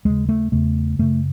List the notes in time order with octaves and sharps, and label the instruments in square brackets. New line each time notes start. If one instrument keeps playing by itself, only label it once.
[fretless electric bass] D#2 C#3 G#3
A3
E2 C#3 A3
F#2 C#3 A3